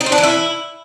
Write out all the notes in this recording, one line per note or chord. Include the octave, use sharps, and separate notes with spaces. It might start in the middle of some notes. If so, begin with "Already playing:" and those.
D#4
C4
D4
E3
E4